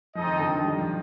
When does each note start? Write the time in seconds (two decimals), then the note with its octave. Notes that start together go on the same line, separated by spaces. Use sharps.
0.15 F3 C4 D#4 A4 D#5
0.27 D#3
0.39 D3
0.51 D#3
0.64 G3
0.78 F3